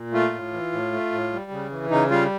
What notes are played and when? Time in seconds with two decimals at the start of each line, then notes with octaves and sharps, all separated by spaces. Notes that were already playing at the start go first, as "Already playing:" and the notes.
Already playing: A#2
0.13 A3 F4
0.34 A2
0.53 E3
0.72 A2
0.92 A3
1.12 A2
1.32 G3
1.51 C#3
1.71 E3
1.90 C#3 D#4
2.10 G3 F4